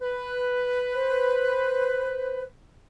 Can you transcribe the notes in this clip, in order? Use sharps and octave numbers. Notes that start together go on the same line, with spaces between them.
B4
C5